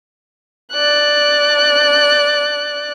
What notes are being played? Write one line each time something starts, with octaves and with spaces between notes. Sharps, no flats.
D5 F#6